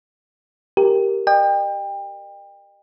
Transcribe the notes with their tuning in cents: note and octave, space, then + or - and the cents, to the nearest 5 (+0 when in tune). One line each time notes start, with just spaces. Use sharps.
G4 +0 A#4 +0
D#5 -35 G5 +30